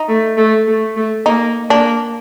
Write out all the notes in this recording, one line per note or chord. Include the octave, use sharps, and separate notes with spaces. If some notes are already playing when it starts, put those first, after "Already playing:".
Already playing: D#4
A3
A3
A3
A3
A#3 D#4
A#3 D4